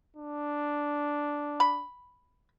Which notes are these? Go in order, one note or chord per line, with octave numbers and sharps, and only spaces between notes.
D4
B5